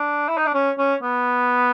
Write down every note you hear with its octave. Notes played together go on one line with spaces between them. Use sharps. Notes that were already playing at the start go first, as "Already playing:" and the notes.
Already playing: D4
E4
D#4
D4
C#4
C#4
B3